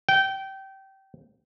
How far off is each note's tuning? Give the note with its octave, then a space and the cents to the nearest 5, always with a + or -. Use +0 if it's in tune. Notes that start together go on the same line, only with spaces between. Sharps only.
G5 -20